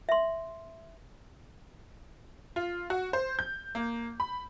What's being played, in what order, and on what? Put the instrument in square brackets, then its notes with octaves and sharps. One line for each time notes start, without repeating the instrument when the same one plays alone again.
[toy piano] E5 C6
[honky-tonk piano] F4
F#4
C5
G6
A#3
B5